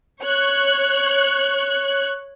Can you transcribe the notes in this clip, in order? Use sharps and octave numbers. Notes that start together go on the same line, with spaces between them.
C#5 F#6